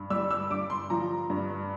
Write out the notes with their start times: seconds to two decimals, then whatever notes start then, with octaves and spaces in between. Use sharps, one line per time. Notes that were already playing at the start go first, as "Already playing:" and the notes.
Already playing: G2
0.10 G3 E6
0.31 E6
0.51 G2 D6
0.70 C6
0.90 F3 A#5
1.30 G2